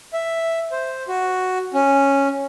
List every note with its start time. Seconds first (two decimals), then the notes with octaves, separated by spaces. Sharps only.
0.13 E5
0.72 C5
1.08 F#4
1.73 C#4